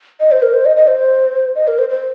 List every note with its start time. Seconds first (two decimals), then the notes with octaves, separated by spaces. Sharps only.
0.20 D#5
0.31 C5
0.42 A#4
0.53 C5
0.65 D#5
0.76 D#5
0.87 C5
1.55 D#5
1.67 A#4
1.78 C5
1.89 C5